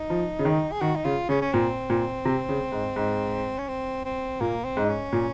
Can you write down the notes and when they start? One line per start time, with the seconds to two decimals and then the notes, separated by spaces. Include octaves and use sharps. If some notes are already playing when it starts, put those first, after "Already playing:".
Already playing: D#4
0.10 F3
0.39 C#3
0.45 D#3
0.72 G#4
0.81 D#3 F#4
0.96 D#4
1.05 C#3 F4
1.29 C#3 C#4
1.42 C#4
1.53 A#2 C4
1.90 A#2
2.25 C3
2.49 C#3
2.72 G#2
2.96 G#2
3.58 C#4
3.68 C4
4.05 C4
4.41 A#2 A#3
4.64 C4
4.77 G#2
4.84 D#4
4.89 C#4
5.12 A#2